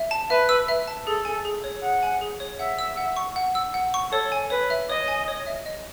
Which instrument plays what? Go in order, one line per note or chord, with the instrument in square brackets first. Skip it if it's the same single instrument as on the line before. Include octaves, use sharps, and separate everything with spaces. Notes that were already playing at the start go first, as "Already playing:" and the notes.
Already playing: [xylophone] E5
A5
[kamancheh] B4 [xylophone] E5
[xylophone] E6
E5
A5
[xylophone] G#4 [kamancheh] A4
[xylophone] G#5
G#4
C#5
[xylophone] G#4 [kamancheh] F#5
[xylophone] G#5
G#4
C#5
[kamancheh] E5 [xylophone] F#5
[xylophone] E6
F#5
C#6
F#5
E6
F#5
C#6
[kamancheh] A4 [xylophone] C#5
[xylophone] G#5
[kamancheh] B4 [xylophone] C#5
[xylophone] E5
[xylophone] C#5 [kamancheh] D#5
[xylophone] G#5
C#5
E5
D#5